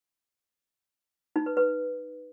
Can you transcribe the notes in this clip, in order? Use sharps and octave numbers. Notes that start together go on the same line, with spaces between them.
D#4
B4
B4